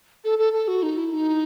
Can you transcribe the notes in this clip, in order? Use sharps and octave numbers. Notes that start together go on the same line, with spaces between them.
A4
A4
A4
F#4
D#4
E4
D#4